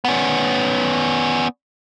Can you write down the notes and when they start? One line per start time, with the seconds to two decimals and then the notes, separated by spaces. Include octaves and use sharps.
0.05 B3 C#4